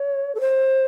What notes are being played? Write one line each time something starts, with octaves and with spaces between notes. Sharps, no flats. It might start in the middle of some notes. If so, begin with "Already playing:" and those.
Already playing: C#5
A4
C5